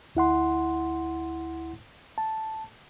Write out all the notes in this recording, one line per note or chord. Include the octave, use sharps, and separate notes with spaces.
D2 E4 F#5 C6
A5